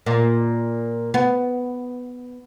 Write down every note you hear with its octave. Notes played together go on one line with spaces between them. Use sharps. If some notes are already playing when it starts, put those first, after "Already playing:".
A#2
B3